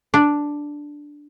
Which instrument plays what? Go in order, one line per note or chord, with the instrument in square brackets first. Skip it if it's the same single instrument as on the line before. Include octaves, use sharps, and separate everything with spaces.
[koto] D4